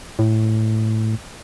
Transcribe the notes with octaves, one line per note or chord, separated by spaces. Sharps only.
A2